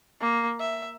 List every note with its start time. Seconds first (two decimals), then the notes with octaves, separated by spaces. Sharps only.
0.21 A#3
0.60 E5